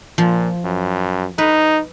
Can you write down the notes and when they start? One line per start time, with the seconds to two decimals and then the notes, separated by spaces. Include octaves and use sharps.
0.18 A#2 F3
0.64 F#2
1.38 D#4 B4